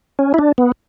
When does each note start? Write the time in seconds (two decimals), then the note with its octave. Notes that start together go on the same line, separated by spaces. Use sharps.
0.19 C#4
0.34 E4
0.39 D4
0.58 B3